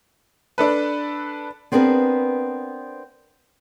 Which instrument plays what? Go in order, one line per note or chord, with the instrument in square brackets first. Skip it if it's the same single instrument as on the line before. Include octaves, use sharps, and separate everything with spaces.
[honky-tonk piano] D4 A4 B4
[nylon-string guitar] B3 C4 D4 G#4 A#4 B4